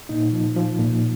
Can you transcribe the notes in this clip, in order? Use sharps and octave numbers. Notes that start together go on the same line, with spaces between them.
A#2 D#4
F3
F3
A#2